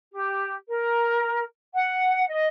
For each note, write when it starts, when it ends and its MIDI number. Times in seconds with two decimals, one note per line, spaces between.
0.13 0.53 67
0.69 1.42 70
1.74 2.25 78
2.28 2.47 75